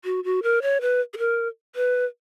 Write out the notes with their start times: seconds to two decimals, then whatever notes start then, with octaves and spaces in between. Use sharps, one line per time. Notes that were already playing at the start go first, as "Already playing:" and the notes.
0.04 F#4
0.24 F#4
0.43 A#4
0.62 C#5
0.81 B4
1.14 G#4
1.18 A#4
1.76 B4